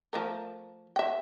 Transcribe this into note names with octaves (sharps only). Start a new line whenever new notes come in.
F3 A3 A#4
E5 G5